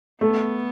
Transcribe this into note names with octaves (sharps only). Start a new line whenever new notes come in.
A3 B3